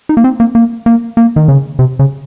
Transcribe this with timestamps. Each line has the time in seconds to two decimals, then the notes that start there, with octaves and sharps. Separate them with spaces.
0.09 D#4
0.17 A#3
0.24 C4
0.40 A#3
0.55 A#3
0.86 A#3
1.17 A#3
1.36 D#3
1.48 C#3
1.79 C3
1.99 C#3